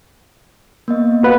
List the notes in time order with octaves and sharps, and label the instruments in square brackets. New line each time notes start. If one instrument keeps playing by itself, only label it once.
[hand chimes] A#3 B3 D#5
[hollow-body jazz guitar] B4 [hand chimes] F5 F#5 F#6